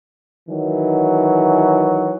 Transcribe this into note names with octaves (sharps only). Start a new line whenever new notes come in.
D#3 E3 F#3